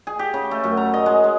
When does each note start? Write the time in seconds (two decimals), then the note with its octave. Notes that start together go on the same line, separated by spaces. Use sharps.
0.07 G#4
0.19 G4
0.34 C#3
0.51 A3
0.64 F#2
0.77 A#5
0.94 D#5
1.06 G#3
1.24 G#3